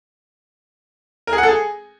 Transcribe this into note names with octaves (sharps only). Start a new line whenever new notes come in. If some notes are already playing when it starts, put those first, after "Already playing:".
A#4
G#4
F#5
A4
G#4